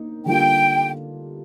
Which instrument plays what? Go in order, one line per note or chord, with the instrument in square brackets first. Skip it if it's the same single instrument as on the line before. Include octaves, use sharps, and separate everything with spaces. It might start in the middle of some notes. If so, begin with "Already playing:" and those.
Already playing: [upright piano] A#3 D#4
[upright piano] D3 G3 A#3 F4 [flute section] G5